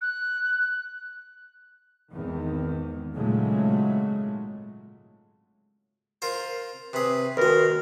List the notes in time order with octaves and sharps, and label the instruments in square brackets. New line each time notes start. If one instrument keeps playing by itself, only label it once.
[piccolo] F#6
[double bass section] G#1 E2 D#3
G#1 A#2 C#3 F#3 G#3 A3
[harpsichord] F4 A#4 C5
[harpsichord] C3 G#4 [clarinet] B4
[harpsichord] D#2 G#3 [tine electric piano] F#4 B4 [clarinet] A#4